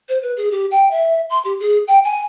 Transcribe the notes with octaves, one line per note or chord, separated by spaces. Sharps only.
C5
B4
G#4
G4
G5
E5
C6
G4
G#4
G5
G#5